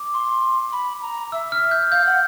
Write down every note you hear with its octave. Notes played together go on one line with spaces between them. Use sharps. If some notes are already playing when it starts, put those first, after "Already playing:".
Already playing: D6
C6
B5
A#5
E5 E6
F6
G6
F5 G6
F#5